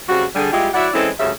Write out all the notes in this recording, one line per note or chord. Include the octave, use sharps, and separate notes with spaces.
C#3 G3 C4 F#4
D3 G3 G#4
G3 G#3 E4 F4 G4
F#3 E4 D5 E5 F#5
E3 G#3 C4 C#4 E4 A4
D2 G2 C#3 E5